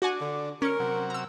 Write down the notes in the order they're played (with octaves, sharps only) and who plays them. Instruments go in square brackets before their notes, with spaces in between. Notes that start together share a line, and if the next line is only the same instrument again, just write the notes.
[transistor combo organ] D4 [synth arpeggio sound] F#4 F#5 G#5
[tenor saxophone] D3
[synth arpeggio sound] C#4 C#7 [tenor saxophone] A#4
[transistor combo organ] C3 F#3
[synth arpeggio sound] A#5 E6